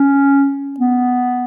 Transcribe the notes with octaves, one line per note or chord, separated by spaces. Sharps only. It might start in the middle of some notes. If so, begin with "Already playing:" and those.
Already playing: C#4
B3